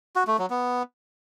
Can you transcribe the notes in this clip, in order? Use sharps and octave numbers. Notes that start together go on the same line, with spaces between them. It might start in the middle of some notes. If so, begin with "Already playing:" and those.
F#4
A3
F#3
B3